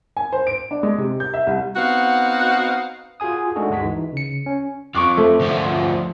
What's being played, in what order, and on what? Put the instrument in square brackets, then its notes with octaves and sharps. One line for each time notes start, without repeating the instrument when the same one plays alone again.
[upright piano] G#5
C5
D7
D4
G#3
C3
G6
E5
C2
[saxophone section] B3 C4 D#4 F#4 F5 F#5
[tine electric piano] F4 F#4 G#4 G#5 D#6
G#3 A3 D4 D#4 F#4 A4
D2 G2 G#3 F#4 B6
E3 D#4
C#3 C#7
C#4
[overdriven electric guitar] F2 [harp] C#6 D6 F#6
[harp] A3
[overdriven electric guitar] D2 F3